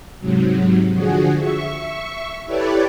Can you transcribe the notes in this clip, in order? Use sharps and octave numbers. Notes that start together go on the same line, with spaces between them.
G#2 C3 F#3
D3 F3 F#4 G#4
E5 C#6
E4 G4 A4 B4 C#5 D5